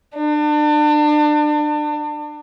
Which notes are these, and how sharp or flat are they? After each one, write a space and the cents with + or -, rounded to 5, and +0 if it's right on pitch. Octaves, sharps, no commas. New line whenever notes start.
D4 +30